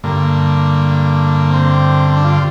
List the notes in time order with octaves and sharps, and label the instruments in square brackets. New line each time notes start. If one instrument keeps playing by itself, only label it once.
[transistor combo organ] G2 D3 A#3
C4
C4
D4
F4